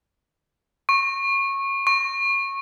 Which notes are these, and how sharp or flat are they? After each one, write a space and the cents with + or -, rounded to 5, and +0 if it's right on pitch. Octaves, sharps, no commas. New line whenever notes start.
C#6 -20
C#6 -20